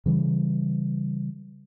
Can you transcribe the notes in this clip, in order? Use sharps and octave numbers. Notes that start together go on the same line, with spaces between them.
C#3 E3 G3